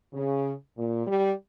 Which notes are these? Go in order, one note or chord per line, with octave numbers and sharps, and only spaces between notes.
C#3
A#2
G3